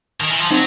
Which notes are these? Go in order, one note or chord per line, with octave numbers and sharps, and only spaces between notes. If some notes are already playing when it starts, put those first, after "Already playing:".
D#3
E3
F3
F#3 C4 D#4